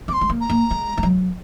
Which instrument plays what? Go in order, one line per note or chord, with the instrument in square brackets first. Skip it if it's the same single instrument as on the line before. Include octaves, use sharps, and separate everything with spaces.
[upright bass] C4 [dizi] C6 D6
[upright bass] G#3
A#3
[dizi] A#5
[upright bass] A#3
G#3
G#3
F#3